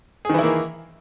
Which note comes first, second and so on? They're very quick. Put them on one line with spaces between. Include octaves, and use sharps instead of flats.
G#4 D#3 E3 E4 A#3